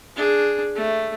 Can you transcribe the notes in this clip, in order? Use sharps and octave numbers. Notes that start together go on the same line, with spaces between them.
D4 G#4
A3